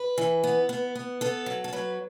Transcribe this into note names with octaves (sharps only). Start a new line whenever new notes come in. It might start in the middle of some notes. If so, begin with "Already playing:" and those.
Already playing: B4
E3
B3
B3
B3
B3 A4
F#3
A4
F#3 B4